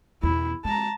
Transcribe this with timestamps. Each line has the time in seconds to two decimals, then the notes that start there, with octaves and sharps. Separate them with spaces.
0.23 E2 B2 E4
0.65 G#3 A5 A#5